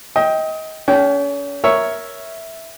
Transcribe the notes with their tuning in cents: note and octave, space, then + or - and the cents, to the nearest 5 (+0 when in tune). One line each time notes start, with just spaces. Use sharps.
D#5 +25 G5 +0
C#4 +35 G#4 +0 G5 -20
A#4 +0 C#5 +0 E5 -5